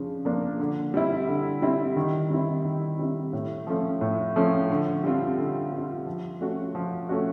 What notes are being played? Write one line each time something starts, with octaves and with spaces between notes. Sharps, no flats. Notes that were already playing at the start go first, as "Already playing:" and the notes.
Already playing: C#3 F3 D4
F3 A#3 D4
D3
G3 C4 E4
D3
G3 C4 E4
D#3
G3 C4 E4
D#3
G3 C4 E4
A2
F3 A3 C#4
A2
F3 A3 C#4
D3
G3 C4 F4
D3
G3 C4 F4
F3
A3 C#4 F#4
F3
A3 C#4 F#4